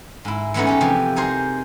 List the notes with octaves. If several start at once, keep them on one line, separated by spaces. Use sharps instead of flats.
G#2 E4
E3 G#3 A3 B3 C#4 D#4
C#4 G4
C3 E3 F3
D#4 G#4 A#4 C5